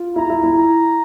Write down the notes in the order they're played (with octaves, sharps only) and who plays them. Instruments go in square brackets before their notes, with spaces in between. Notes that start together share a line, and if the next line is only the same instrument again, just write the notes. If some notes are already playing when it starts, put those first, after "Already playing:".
Already playing: [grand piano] F4
[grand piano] E4 [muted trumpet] A#5
[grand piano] E4
E4
[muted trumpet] A#5